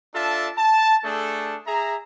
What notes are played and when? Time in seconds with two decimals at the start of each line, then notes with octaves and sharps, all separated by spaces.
0.15 D4 F4 A4 E5 A5
0.57 A5
1.04 A3 D4 G#4 A4
1.67 G#4 E5 A#5